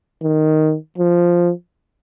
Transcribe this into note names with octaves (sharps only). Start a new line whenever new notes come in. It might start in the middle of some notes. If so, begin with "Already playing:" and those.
D#3
F3